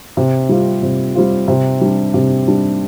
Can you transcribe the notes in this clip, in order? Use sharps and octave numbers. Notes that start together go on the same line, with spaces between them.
C3
G3 C4 F4
C3
G3 C4 F4
C3
G3 D4
C3
G3 D4